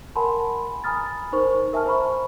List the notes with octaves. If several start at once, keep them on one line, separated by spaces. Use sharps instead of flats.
A#4 F#5 G#5 A5 B5 C6
G#5 A#5 B5 D#6 F6 A6
D#4 A#4 C5 C#6
A#4 E5 G#5 A5 F6
C5 A#5 B5 C#6